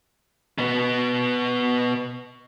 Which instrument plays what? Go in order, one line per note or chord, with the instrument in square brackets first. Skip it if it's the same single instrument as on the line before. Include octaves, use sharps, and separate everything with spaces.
[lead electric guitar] B2 B3